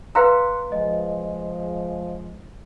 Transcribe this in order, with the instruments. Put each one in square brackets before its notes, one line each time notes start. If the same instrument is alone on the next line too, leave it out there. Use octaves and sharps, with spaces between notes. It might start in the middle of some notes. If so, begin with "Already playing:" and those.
[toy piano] B4 F5 A#5 [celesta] C6 F#6 C#7
[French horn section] F3 G#3 [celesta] D#5